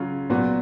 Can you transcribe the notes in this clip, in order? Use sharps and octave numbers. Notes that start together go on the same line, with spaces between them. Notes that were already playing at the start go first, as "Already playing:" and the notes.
Already playing: C#3 F#3 C#4 F4
A#2 F#3 B3 F#4